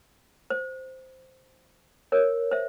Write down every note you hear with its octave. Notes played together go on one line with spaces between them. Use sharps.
C5
A#4 C#5
C5 E5